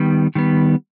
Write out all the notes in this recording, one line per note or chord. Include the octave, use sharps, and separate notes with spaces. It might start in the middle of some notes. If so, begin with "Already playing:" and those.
Already playing: D#3 G3 B3
D#3 G3 B3